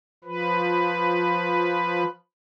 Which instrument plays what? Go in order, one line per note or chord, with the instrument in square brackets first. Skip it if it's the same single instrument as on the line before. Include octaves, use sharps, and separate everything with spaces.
[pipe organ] F3 B4